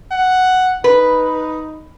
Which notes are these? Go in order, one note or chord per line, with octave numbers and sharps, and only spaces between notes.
F#5
D#4 B4